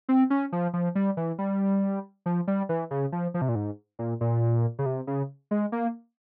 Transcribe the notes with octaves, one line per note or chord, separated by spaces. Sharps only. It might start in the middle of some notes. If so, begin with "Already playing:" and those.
C4
C#4
F3
F3
G3
E3
G3
F3
G3
E3
C#3
F3
F3
C3
A#2
G#2
A#2
A#2
C#3
C3
C#3
G#3
A#3